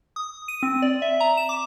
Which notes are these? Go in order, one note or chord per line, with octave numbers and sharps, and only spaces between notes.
D#6
D#7
C4
D5
E5
A#5
E7
D6